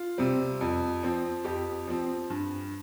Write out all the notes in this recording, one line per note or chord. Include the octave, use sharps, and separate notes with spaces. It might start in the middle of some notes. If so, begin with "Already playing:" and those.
Already playing: F4
C3 G3 C4
F2
F3 C4
F2 G4
F3 C4
G2